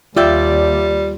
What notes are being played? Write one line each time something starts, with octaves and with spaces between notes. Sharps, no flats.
D#2 G3 F4 D5 E5 G5